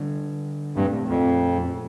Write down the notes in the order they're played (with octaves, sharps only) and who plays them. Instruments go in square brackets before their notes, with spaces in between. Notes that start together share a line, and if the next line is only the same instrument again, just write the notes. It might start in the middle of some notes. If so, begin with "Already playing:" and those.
Already playing: [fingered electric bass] D3 G3 D4
[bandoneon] G2 [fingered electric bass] A#2 F3 A3 C4
[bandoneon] F2